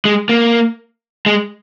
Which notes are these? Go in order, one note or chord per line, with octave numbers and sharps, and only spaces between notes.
G#3
A#3
G#3